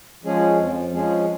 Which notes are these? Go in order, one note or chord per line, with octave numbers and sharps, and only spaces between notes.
F3 G#3 C#4 G#4
F2
F3 G#3 C#4 G#4